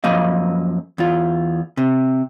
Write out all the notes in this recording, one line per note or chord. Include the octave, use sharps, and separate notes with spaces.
F#2 F3 A#3 D#5 F5
E2 F4
C3